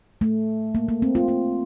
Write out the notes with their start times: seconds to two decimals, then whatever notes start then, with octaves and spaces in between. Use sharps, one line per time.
0.21 A3
0.75 A#3
0.89 A#3
1.02 C4
1.15 F4
1.28 F4